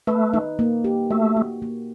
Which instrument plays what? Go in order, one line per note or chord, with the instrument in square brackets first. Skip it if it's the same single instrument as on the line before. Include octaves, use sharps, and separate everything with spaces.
[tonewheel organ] A3 [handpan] B4
[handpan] D#4
A#3
G4
[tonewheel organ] A3 [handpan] F#4
[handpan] F#4
A#3